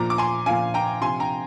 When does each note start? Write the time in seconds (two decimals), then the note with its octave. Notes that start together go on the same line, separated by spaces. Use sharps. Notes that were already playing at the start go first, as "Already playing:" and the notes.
Already playing: A#2 F3 A#5 D6
0.10 D6
0.18 G#5 C6
0.46 A#2 F3 F5 G#5
0.74 G5 A#5
1.01 C3 F3 G#5 C6
1.20 G5 A#5